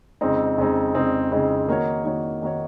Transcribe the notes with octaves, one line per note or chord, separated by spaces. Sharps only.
F2 C#3 G#3 C4 D#4
F2 C#3 G#3 C4 D#4
F2 C#3 G#3 C4 D#4
F2 C#3 G#3 C4 D#4
D#3 A#3 D#4 F#4 C#5
D#3 A#3 D#4 F#4 C#5
D#3 A#3 D#4 F#4 C#5